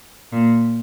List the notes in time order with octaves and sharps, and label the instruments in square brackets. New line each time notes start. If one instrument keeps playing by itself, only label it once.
[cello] A#2